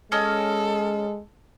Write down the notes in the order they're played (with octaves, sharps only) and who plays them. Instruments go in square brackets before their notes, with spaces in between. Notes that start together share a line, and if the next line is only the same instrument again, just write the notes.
[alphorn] G#3 [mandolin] C#4 D#5 [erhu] A4